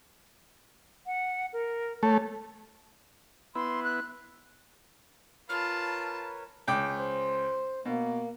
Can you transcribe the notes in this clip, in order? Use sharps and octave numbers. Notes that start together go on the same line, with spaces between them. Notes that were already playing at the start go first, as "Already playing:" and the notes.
F#5
A#4
A3 C#5
B3 E4 C6
F#6
F4 A#4 B4 C#5 A5 B5 F6
C#2 G5 D6
C5
B2 A#3